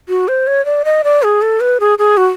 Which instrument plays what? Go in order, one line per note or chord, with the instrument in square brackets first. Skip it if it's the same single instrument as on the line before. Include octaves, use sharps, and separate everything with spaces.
[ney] F#4
C5
C#5
D5
D#5
D5
G#4
A4
B4
G#4
G#4
F#4